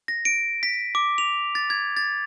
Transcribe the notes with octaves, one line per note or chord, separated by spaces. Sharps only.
A#6
D7
B6
D6
F7
A6
G#6
A6